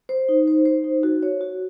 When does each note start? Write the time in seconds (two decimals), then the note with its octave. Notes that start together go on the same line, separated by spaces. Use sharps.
0.09 C5
0.29 D#4
0.48 C5
0.65 C5
0.84 D#4
1.03 F#4
1.23 C#5
1.41 F#4